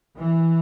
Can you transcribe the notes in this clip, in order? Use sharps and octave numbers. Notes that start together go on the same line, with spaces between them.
E3